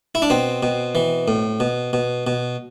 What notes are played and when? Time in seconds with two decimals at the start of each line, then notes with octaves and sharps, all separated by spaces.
0.15 E4
0.22 D4
0.30 B2 C4
0.63 B2
0.95 E3
1.28 A2
1.60 B2
1.93 B2
2.27 B2